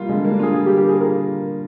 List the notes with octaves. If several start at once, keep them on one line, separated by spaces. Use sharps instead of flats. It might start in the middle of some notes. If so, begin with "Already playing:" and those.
Already playing: G3 A#3 F4
D3 G#3
A#3
D4
F4 G#4
G3 G#4
G4
D3
G4
A#3 G#4
F4 A#4